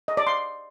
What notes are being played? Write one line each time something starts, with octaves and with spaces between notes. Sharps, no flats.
D#5
D5
C6